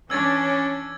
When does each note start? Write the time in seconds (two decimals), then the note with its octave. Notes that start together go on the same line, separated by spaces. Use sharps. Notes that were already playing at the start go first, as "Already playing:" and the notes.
0.10 E3 C#4 D4 E6 G#6 A6